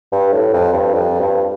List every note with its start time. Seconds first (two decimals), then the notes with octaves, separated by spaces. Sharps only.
0.12 G2
0.33 A2
0.53 F2
0.73 G2
0.94 F2
1.20 G2